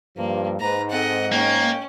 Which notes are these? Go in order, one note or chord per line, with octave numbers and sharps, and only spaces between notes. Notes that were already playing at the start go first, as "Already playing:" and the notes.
G2 F3 A#3
G#2 B4 A#5
C4 A4 D#5 F#5
A#3 C#4 D#5 G5